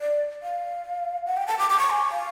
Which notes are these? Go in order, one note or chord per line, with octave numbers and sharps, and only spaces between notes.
D5
F5
F#5
G5
A5
D6
D6
C#6
G#5
F5